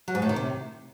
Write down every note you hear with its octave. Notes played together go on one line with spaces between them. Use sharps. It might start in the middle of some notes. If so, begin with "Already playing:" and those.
F#3
G#2
A2
D#3
C3